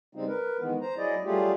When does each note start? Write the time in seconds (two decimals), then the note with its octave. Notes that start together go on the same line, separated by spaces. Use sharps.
0.15 C#3 G3 G#3 C4 D#4
0.28 A#4 B4
0.60 D#3 E3 G#3 B3
0.81 C5 A#5
0.97 F#3 E4 G#4 D5 D#5
1.25 F#3 G3 A3 F4 G4 G#4